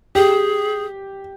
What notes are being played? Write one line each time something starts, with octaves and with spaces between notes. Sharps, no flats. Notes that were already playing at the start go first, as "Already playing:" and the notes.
G4 G#4